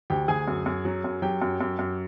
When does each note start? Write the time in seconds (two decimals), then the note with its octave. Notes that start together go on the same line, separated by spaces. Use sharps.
0.10 D2 G4 G5
0.28 D2 G#4 G#5
0.48 F#2
0.66 F#2
0.85 F#3
1.04 F#2
1.22 F#3 G4 G5
1.42 F#2
1.61 F#2
1.79 F#2